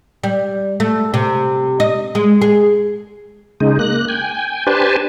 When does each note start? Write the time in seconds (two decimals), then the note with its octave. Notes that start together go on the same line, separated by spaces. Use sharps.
0.24 G3
0.80 A3
1.14 C3
1.80 D#5
2.15 G#3
2.42 G#4
3.60 C#3 G#3 D#4
3.79 A#3 F#6
4.09 G5 G#5
4.67 D4 G4 B4 C5 G#5 A5